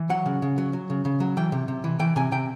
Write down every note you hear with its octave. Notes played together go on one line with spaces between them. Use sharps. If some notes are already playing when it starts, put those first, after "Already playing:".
Already playing: E3
F#3 F#5
C#3
C#3
F#3
F#3
C#3
C#3
F#3
E3 G5
C3
C3
E3
E3 G5
C3 G#5
C3 G5